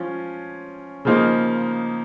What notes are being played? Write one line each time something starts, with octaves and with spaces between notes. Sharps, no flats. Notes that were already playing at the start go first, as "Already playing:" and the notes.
Already playing: F3 C#4 F4
C#3 F3 A#3 D#4